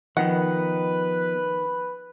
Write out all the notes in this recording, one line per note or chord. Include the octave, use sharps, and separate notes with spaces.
D#3 F3 B3 B4 F#5